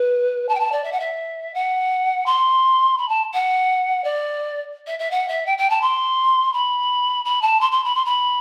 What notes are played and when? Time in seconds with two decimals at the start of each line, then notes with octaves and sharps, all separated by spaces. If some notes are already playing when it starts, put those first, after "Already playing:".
Already playing: B4
0.48 A5
0.55 G5
0.59 A5
0.72 D5
0.84 E5
0.92 F#5
0.99 E5
1.54 F#5
2.26 C6
2.98 B5
3.08 A5
3.33 F#5
4.04 D5
4.87 E5
4.99 E5
5.10 F#5
5.28 E5
5.46 G5
5.58 G5
5.69 A5
5.81 C6
6.53 B5
7.25 B5
7.41 A5
7.60 C6
7.71 C6
7.84 B5
7.95 C6
8.05 B5